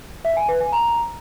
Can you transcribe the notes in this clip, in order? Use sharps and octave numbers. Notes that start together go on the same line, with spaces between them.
E5
G#5
B4
G#5
A#5